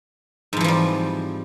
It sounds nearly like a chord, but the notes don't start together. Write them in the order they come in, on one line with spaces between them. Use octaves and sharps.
G#2 F2 E3 F3 G3